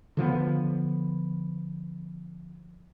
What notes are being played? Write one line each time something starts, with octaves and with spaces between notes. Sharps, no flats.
D3 F3 G3 B3